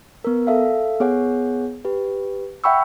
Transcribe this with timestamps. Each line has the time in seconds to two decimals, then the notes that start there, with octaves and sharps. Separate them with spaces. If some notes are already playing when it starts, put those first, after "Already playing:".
0.24 B3 A#4
0.47 A4 E5 F5
1.00 B3 G#4 C#5 F#5
1.85 G4 B4
2.64 E5 F#5 G5 B5 C#6 E6